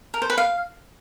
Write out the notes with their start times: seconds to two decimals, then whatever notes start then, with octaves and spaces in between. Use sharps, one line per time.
0.14 A#4
0.22 C5
0.30 B4
0.38 F5